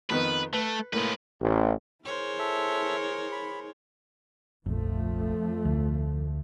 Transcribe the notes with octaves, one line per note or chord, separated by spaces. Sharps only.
F2 D#3 B3 B4
A3 B4
A2 G#3 A#3 B4
A1
E4 G#4 A#4 C5 C#5
A4 E5
B5
F1 A#1 F2 F3 A3
D2